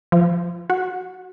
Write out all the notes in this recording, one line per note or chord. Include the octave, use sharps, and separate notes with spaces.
F3
F#4